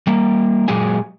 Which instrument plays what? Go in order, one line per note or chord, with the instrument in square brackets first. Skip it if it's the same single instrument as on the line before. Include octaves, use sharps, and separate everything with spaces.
[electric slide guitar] G3 A#3
A#2 F#3 G#3 G4 G#4 G#5